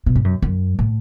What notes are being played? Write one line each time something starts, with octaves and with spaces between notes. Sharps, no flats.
B2
G#2
F#2
F#2
A2